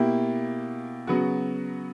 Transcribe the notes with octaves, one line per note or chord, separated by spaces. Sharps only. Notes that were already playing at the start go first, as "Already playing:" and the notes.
Already playing: B2 A#3 E4 G4
C#3 F#3 B3 F#4